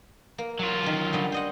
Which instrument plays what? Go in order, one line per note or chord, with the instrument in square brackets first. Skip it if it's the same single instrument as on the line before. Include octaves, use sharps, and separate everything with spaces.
[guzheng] A#3
[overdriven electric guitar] F#3 F4
[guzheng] D#3 C#4
D3 G3 D#5
C5 D#5 F#5